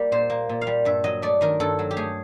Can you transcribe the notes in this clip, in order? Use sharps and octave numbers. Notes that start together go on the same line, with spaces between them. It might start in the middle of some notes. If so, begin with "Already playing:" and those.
Already playing: G3 A#3 D5
A#2 C5
A#3
A#2
F5
G3
G2 E5
F#3 D#5
A3 D5
D#3 A#4
G2 A4
F#3
G4
A3 G#4